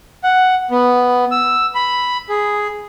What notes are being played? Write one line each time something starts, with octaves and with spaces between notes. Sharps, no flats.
F#5
B3
E6
B5
G#4